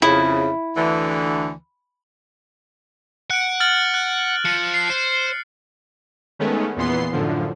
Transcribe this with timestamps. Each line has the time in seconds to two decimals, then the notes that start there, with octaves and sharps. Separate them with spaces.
0.02 F2 C#3 E4
0.77 D2 D3 E3
3.30 F#5 F#6 D7
3.60 F6 A6 F#7
3.94 F#6
4.45 F3 C#7
4.74 C7
4.89 C5
6.39 D#3 G#3 A3 B3 C#4
6.76 E2 A#2 E3 B3 C6 C7
7.12 F#2 A2 D3 F3